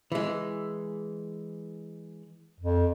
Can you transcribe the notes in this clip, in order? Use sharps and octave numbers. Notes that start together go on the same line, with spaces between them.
E3 G#3
F2